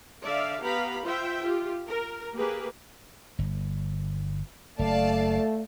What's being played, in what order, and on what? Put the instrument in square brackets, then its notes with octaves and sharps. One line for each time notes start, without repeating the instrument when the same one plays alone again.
[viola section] D3 D5 E5 F5
B3 G4 F5 A#5 B5
F4 C5 E5 G5
F4 G4
A#4
A#3 G4 G#4 B4
[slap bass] G1
[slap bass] F#1 [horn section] A3 [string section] D5 F5 A5